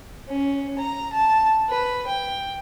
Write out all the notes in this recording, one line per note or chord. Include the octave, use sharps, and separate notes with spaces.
C#4
A#5
A5
B4
G5